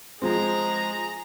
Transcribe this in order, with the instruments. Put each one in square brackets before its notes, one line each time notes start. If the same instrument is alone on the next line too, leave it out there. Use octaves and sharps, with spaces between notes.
[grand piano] F3 G#3 C4 [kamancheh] G#4 A#5